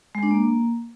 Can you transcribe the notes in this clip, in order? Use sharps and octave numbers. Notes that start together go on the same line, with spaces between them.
G#3
D4
A#3